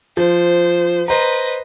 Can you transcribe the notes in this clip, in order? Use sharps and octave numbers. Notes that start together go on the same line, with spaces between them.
F3 C5
B4 C5 D#5 A#5